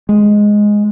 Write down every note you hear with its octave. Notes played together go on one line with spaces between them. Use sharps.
G#3